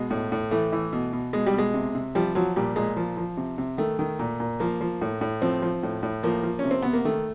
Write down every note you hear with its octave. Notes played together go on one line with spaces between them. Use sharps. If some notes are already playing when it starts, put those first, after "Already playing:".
Already playing: B2 G#3
A2
A2
E3 A3
E3
B2
B2
B2 G#3
G3
B2 G#3
C3
C3
F3 G3
F3 F#3
A#2 G3
A#2 G#3
F3
F3
C3
C3
D#3 A3
D#3
A#2
A#2
F3 A#3
F3
A2
A2
F3 C4
F3
A2
A2
F3 A#3
F3
C3 C#4
C4
C3 B3
A#3
D#3 A3